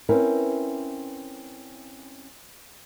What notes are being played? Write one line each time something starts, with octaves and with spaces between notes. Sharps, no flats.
C4 C#4 E4 A#4 B4